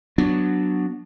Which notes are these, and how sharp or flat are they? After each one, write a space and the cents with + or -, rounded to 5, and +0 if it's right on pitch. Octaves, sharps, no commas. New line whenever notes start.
F#3 +0 B3 -10 D4 +0